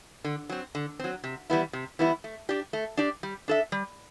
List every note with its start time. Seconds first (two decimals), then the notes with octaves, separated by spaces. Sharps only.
0.24 D3
0.49 F#3 C4
0.75 D3
1.00 F#3 C4
1.24 C3
1.50 E3 G3 B3 E4
1.73 C3
1.99 E3 G3 B3 E4
2.24 A3
2.49 D4 G4 D5
2.73 A3
2.97 D4 G4 D5
3.23 G3
3.48 D4 A4 E5
3.72 G3